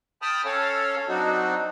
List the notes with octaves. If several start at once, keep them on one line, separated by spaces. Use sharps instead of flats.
G5 A5 B5 D#6 F6
C#4 A4 C#5 F5
F#3 C4 D4 D#4 F#4